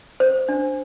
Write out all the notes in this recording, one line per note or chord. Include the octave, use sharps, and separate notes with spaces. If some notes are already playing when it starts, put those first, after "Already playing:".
C5
D4